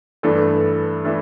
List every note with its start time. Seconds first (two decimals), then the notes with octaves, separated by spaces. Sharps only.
0.23 G2 E3 A3 D4 A4
1.04 E3 A3 D4 A4